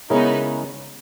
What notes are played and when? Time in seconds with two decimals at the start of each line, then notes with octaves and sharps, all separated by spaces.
0.10 C#3 G#3 B3 C#4 D#4 E4 A#4